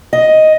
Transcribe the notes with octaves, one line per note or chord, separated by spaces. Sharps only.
D#5